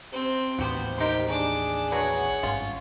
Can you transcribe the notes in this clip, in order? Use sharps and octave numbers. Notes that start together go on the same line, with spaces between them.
C3 C4
A1 D#2 B3 F#4 G4 C5
D#4 G4 A#4 C6
D4 G#4 D6
E3 F#3 B3 C#5 F#5
G#1 G2 C#4 F4